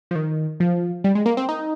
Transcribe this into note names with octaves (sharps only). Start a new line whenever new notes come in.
F3
D#3
F3
G3
G#3
A#3
C4
D#4